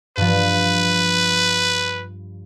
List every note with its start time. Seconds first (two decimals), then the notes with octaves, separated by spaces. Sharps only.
0.17 G2 F3 B4